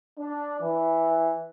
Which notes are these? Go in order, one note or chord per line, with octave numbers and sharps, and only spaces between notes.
D4
E3